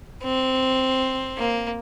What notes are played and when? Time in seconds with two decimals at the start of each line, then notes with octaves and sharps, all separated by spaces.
0.23 C4
1.38 A#3